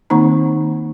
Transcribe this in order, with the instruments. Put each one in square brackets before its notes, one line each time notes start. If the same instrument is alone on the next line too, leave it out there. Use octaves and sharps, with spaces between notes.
[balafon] D#3 A#3 C4 D#4 A#5